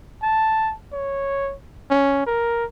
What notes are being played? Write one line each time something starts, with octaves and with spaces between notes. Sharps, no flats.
A5
C#5
C#4
A#4